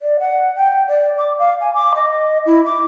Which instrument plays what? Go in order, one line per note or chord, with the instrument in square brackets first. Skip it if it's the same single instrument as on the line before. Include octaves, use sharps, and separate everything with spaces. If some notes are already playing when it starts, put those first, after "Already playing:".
[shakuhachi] D5
F#5
G5
D5
D6
F5
G#5
D6
D#5
E4
D6